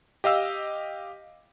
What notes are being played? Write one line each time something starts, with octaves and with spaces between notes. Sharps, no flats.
G4 D#5 F5 E6